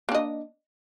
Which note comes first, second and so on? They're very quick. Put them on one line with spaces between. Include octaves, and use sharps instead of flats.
A#3 D4 D#5